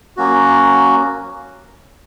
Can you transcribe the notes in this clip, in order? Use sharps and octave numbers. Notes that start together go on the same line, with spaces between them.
F#3 A#3 C#4 F#4